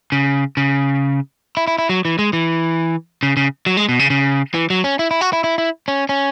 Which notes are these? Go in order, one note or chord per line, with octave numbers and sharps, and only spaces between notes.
C#3
C#3
E4
E4
E4
F#3
E3
G#3
E3
C#3
C#3
F#3
G#3
B2
C#3
C#3
E3
F#3
C#4
E4
E4
F#4
E4
E4
E4
C#4
C#4